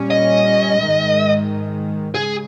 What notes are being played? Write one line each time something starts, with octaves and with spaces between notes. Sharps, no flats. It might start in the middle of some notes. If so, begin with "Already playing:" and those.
Already playing: A#2 G3 C#4
D#5
G#2 D#3 G#3
C#3 G#3 G#4